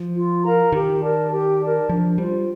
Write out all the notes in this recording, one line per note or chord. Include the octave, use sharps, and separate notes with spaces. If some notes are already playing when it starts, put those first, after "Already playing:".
Already playing: F3
F4
A#4 F5 A#5
D#3 G4
A#4 D5 A5
G4
A#4 D5 A5
F3 D4
G3 F4 C5